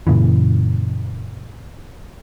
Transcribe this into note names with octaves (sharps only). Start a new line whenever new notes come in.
F#2 A#2 C#3 E3